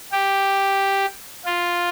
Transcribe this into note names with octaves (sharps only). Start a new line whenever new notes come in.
G4
F4